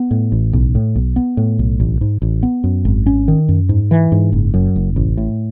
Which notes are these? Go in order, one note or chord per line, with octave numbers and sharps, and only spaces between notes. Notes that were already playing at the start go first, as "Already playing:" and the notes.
Already playing: B3
A2
A1
B1
A2
B1
B3
A2
B1
A1
G#2
A1
B3
F#2
G#1
C#4
D#3
F#2
G#2
E3
G#2
F#1
F#2
F#1
A1
A2